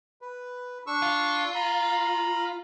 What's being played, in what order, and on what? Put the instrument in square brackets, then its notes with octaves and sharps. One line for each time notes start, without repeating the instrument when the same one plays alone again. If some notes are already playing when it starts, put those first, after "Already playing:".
[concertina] B4
D4 C#6 E6
[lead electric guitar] F4
[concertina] A#5 B5